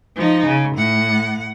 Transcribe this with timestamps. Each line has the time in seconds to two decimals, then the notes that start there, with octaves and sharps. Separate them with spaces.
0.16 F3 D#4
0.47 C#3
0.76 A2 F#5